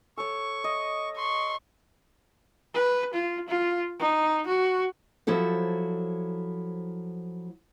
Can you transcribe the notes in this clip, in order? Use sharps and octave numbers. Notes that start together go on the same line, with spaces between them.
A4 C#5 C#6
D#5
C6 C#6
B4
F4
F4
D#4
F#4
F3 F#3 E4 A4 C5